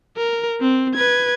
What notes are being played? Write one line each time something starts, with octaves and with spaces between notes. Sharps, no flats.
A#4
C4
B4 G#6